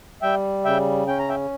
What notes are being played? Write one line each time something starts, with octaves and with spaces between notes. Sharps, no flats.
G3 E5 G5
C#3 E5 G5
C#4 G5
A#5
E5 G5